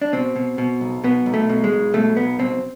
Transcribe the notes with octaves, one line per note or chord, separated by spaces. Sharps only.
D4
B2 C4
B2
B2
B1
B2 B3
B1
A3
B2
G#3
B1
B2 A3
B1 B3
B2 C4